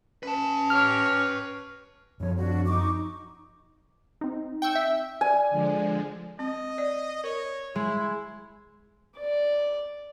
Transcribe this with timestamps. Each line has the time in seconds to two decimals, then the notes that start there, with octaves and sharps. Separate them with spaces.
0.23 C#4 B4 A5
0.70 G4 C#5 F6
2.20 F#2 F3 C#5
2.36 D4 F#4
2.67 D#4 C#6 D6
4.21 C4 D#4
4.62 G5 C#6 E6
4.75 E5
5.21 D5 G#5
5.50 D3 F3 G#3
6.39 C4 D#5
6.78 D5
7.24 A#4 C#5
7.75 G#3 E4
9.17 D5